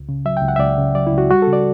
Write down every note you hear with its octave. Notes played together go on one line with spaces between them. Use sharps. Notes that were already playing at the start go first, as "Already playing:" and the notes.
Already playing: C#2
C#3
F#3 E5
G5
C#2
F#5
E5
C#2 D5
C#3
F#3 D5
E4
C#2
F#4
G3 F#4
C#3 A4
D5